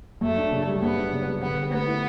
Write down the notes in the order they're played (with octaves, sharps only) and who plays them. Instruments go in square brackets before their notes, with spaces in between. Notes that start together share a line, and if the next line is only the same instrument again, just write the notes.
[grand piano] F#2 [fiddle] A3
[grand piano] D4
C#3
G3
[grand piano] F#2 [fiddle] B3
[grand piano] D4
C#3
G3
[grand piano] D3 [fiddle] B3
[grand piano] G4
[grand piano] A3 [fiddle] B3
[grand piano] E4